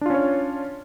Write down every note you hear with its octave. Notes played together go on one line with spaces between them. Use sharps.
C#4 D4 F4 C#5